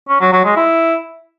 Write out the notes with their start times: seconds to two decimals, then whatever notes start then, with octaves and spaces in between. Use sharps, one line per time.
0.09 C#4
0.21 F#3
0.32 F#3
0.44 G#3
0.56 E4